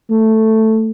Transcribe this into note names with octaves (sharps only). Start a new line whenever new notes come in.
A3